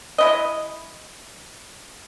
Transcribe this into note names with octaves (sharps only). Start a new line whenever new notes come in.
G#3 E4 D#5